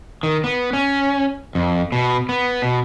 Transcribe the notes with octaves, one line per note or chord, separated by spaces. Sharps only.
D#3
B3
C#4
F2
B2
B3
B2